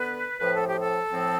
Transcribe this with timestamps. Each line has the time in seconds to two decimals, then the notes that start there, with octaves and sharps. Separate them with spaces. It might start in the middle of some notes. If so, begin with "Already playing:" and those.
Already playing: D3 B3 B4
0.39 A2 F3 C4 B4
0.54 A4
0.67 G4
0.80 A4
1.11 A2 F3 C4